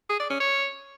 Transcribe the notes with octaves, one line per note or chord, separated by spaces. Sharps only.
G#4
D5
C#4
C#5